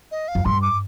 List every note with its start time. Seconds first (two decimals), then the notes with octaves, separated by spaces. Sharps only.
0.11 D#5
0.28 F5
0.35 F2
0.45 G2 C6
0.62 D6